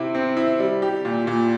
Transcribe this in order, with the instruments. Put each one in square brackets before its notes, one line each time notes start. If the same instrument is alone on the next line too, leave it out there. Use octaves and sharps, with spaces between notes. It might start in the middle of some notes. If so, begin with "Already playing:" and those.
Already playing: [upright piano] C3 C4 E4
C4
E4
G3
G4
A#2
A#2